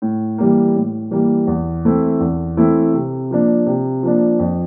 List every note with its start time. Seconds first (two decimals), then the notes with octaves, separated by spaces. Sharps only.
0.02 A2
0.38 E3 G3 A#3
0.75 A2
1.11 E3 G3 A#3
1.47 E2
1.85 E3 A3 C4 E4
2.20 E2
2.57 E3 A3 C4 E4
2.94 C3
3.31 F3 A#3 D4
3.66 C3
4.03 F3 A#3 D4
4.39 F2